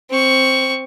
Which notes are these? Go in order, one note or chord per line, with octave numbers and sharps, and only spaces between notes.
C4 C#6